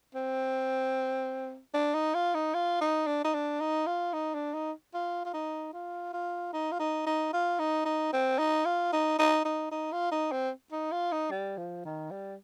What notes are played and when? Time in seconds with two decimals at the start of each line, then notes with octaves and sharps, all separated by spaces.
0.15 C4
1.74 D4
1.94 D#4
2.14 F4
2.34 D#4
2.54 F4
2.81 D#4
3.07 D4
3.24 D#4
3.34 D4
3.60 D#4
3.86 F4
4.13 D#4
4.34 D4
4.54 D#4
4.94 F4
5.25 F4
5.33 D#4
5.73 F4
6.13 F4
6.53 D#4
6.72 F4
6.79 D#4
7.06 D#4
7.33 F4
7.59 D#4
7.85 D#4
8.13 C4
8.39 D#4
8.65 F4
8.93 D#4
9.19 D#4
9.45 D#4
9.71 D#4
9.92 F4
10.11 D#4
10.32 C4
10.71 D#4
10.91 F4
11.12 D#4
11.31 G3
11.57 F3
11.85 D#3
12.11 G3